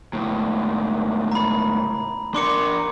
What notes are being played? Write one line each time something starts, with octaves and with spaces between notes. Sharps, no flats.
C#2 A2
A#5 B5
D4 A#4 C6 D6 C#7